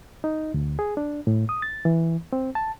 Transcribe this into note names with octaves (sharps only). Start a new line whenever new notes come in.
D#4
D2
G#4
D4
A2
D#6
A6
E3
C4
A5